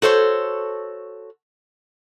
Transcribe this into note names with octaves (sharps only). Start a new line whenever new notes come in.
F#4 A4 C5 C#5